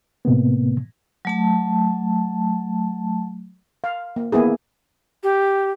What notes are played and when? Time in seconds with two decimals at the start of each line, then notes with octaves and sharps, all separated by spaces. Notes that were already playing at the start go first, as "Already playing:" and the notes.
0.25 A2 C3 A#3 B3
1.25 F#3 A3 A5
3.84 F5
4.16 A#3
4.32 A#3 B3 E4 G#4
5.23 G4